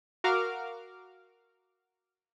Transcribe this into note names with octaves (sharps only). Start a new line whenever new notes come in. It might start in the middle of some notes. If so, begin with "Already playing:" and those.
F#4 A#4 F5 D6 F6